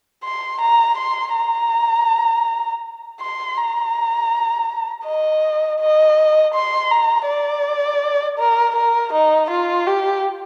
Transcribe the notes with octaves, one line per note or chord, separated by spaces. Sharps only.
C6
A#5
C6
A#5
C6
A#5
D#5
D#5
C6
A#5
D5
A#4
A#4
D#4
F4
G4